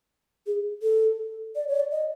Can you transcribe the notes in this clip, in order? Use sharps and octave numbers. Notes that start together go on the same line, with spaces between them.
G#4
A4
D5
C#5
D5
D#5